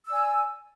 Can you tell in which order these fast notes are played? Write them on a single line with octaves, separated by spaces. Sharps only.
E6 D5 G#5